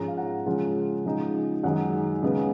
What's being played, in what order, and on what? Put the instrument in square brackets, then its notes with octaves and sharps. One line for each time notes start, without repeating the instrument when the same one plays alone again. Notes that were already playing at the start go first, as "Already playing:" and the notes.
Already playing: [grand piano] G#2 F3 G#3 C#4 A#5
F5
F#5
C#3 F3 G#3 C#4 F4
C#3 F3 G#3 D#4
F#2 D#3 G#3 D#4 F#5
C#3 G#3 B3